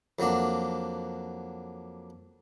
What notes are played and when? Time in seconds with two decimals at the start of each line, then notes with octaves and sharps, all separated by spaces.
0.19 F2 F#3 A#3 D4